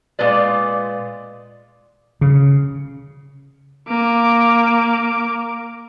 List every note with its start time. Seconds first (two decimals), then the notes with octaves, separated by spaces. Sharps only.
0.19 A#2 G#3 F4 B4 D5
2.21 C#3
3.89 A#3 D6